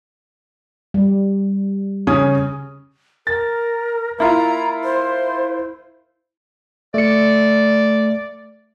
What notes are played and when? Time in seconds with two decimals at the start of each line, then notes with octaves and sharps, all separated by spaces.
0.94 G3
2.07 C#3 C#4 D#6
3.27 A#4 A6
4.18 A#3 E4 F4 A#5
4.84 C5
6.94 A3 D5 C#7